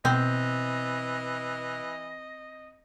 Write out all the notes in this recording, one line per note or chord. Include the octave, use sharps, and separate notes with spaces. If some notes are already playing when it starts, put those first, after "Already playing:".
B2 E3 C4 D#5